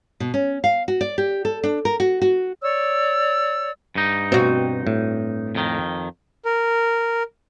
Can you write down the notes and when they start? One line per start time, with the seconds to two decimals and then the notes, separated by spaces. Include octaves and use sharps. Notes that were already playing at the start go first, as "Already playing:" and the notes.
0.20 B2
0.34 C#4
0.64 F5
0.88 F#4
1.01 D5
1.18 G4
1.45 A4
1.64 D4
1.85 A#4
2.00 F#4
2.22 F#4
2.62 C#5 D5 E6
3.95 G2 D#4
4.32 B2 C4 F#4
4.87 A2
5.55 F2 D#3
6.45 A#4